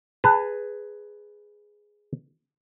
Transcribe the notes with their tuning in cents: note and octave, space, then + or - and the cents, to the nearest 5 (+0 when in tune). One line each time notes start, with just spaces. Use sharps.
G#4 +0 B4 +5 A5 +35